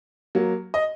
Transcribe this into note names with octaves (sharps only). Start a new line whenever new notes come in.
F#3 A#3
D#5